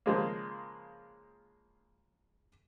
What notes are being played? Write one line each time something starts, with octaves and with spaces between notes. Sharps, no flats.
C#3 F3 G#3 A#3